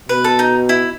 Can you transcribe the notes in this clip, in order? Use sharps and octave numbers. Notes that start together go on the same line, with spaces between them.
B2 B4
A4
D#4
E4